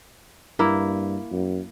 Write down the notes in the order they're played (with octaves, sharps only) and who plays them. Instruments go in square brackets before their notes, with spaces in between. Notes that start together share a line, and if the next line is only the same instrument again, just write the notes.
[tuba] G2 [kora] A#3 E4
[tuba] F#2